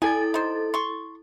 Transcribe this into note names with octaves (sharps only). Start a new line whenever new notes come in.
E4 A4 G#5 A6
D#4 C5
C6 C#6